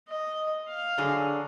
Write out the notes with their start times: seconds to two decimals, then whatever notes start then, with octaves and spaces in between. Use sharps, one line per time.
0.08 D#5
0.68 F5
0.98 D3 F#3 D4 G#4